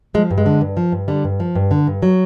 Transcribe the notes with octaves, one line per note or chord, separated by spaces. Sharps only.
F3 G#3
G2
G#3
D3
G2
F3
G2
D3 G3
G2
F3
G2
D3
G2
F#3